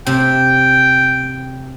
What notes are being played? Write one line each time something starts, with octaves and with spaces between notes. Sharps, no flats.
C3 G5